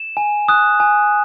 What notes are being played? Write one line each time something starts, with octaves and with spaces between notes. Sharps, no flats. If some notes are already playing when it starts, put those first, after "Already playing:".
Already playing: E7
G#5
D#6 F#6
G#5